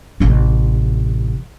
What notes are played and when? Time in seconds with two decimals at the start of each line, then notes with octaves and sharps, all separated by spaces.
0.20 A1 C3